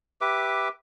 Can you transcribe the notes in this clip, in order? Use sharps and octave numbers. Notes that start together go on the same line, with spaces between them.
G4 B4 E5 D6